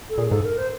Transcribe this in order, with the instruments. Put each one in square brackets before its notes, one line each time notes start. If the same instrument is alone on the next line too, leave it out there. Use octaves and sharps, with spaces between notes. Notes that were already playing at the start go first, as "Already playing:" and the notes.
[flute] A4
[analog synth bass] A#2 [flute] G#4
[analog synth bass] A2
[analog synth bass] G#2 [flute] A4
[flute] A#4
C5